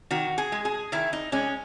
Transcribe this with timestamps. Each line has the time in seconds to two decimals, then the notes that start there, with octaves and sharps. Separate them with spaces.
0.11 D#3 F#4
0.38 G#4
0.52 G#3
0.65 G#4
0.92 D#3 E4
1.13 D#4
1.32 G#3 C#4